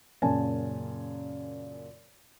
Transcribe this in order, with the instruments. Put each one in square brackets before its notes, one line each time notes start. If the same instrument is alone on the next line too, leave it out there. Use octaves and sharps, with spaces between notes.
[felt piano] F#2 A#2 C#3 G#5 A5